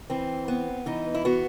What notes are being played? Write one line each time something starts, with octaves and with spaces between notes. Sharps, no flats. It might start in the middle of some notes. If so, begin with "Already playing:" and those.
E3 C4
B3
E3 D#4
E4
B3 F#4